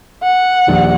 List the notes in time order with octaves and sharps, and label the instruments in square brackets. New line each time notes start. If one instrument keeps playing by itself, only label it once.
[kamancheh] F#5
[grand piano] D#1 A#1